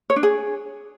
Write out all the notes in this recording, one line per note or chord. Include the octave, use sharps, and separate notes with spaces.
C#5
D4
G#4